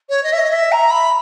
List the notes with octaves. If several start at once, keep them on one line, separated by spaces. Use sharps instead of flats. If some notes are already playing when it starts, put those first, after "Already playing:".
C#5
D#5
E5
D#5
E5
A#5
B5